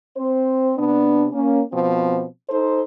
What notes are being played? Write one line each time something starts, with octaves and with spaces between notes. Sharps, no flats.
C4 C5
C3 B3 D4
A#3 C#4
B2 F3 C4
D#4 A4 C5